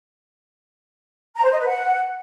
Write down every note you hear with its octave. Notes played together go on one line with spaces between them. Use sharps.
A#5
C5
D#5
B4
F#5